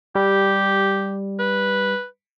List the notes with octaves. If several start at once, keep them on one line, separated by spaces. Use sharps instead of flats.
G3 G4
B4